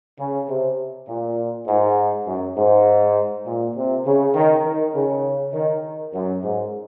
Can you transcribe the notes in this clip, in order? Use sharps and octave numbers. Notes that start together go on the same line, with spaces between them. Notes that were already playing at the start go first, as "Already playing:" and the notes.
C#3
C3
A#2
G#2
F#2
G#2
A#2
C3
C#3
D#3
D#3
C#3
D#3
F#2
G#2